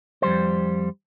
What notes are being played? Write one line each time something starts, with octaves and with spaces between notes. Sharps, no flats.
F2 G3 C5